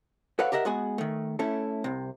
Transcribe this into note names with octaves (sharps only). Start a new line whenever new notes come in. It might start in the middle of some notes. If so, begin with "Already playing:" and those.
A4 B4 C#5 D5 F5 F#5
G4 A#4 D#5 E5 F#5
G#3 B3 F#4 G#4 F#5 G#5
D#3 A3
A3 C#4 E4 A4
C2 C3